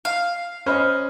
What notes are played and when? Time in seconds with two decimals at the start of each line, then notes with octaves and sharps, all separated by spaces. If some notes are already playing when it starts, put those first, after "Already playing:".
0.05 F5 C7
0.66 C#4 C5 D#5 B5 F6